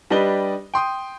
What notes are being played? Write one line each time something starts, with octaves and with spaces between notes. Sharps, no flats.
G3 D4 G4 B4 D#5 G7
G5 C6 D#6